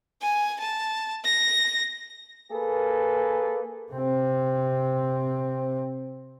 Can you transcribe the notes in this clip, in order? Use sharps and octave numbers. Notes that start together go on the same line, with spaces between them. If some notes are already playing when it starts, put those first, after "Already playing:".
G#5
A5
A#6
A#3 G#4 A4 B4
C3 C4